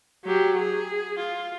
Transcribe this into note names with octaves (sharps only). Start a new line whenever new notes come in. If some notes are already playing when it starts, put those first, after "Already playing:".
F#3 G4
G#4
F4